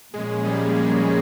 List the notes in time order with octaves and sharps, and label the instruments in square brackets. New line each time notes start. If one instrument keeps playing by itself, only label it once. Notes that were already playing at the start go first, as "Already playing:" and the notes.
[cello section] A#2 F3 A#3 C#4 G#4 [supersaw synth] G#3
[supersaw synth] G3
G3